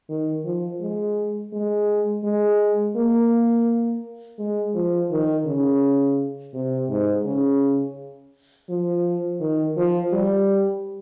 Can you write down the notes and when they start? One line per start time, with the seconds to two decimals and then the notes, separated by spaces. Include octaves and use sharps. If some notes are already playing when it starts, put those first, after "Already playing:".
0.09 D#3
0.45 F3
0.81 G#3
1.52 G#3
2.24 G#3
2.96 A#3
4.39 G#3
4.75 F3
5.11 D#3
5.46 C#3
6.54 C3
6.89 G#2
7.25 C#3
8.69 F3
9.41 D#3
9.77 F3
10.13 G3